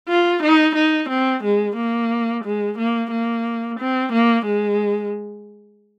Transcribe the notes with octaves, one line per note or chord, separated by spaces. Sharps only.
F4
D#4
D#4
C4
G#3
A#3
G#3
A#3
A#3
C4
A#3
G#3